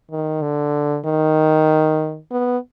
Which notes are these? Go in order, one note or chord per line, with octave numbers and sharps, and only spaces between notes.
D#3
D3
D#3
B3